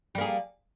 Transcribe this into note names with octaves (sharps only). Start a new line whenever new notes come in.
G3 A#3 G#4